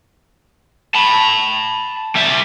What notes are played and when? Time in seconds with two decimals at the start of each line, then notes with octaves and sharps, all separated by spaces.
0.94 A5 B5
2.15 G3 E5